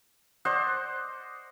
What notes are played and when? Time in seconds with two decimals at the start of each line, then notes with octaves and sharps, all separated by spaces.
0.45 C5 D5 D#5 F#5